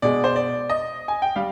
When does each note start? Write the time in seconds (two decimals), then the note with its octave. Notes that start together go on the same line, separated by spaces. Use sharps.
0.02 B2 G#3 D5
0.24 C5
0.36 D5
0.70 D#5
1.08 G#5
1.22 G5
1.36 G3 F5